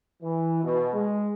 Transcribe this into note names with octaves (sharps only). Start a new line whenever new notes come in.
E3
B2
G#3